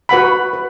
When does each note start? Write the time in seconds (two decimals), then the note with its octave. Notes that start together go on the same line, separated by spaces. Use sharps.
0.09 F#4 B4 F#5 B5
0.53 B4